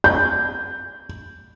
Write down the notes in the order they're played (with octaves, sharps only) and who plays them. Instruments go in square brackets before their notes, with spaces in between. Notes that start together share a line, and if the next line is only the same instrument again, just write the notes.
[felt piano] G6